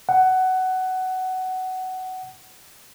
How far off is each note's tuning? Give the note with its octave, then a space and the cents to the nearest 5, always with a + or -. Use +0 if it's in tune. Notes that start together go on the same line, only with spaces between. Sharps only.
F#5 +15